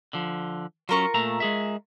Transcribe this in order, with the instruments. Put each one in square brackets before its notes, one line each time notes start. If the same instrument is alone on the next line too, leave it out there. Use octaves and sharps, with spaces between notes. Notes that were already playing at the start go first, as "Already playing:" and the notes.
[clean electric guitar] D3 F3
[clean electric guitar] F#3 C#4 [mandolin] F4 A#4 C#6
[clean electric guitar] A#2 A3 A#5
G#3 G#4 E5